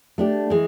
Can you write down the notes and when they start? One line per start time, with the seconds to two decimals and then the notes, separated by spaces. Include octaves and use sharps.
0.18 A3 D4 G4
0.50 E3 G#3